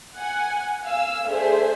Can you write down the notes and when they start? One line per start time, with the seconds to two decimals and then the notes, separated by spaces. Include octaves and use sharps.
0.15 F#5 G#5
0.84 F5 G#5 E6
1.25 A3 D4 G#4 C5 E5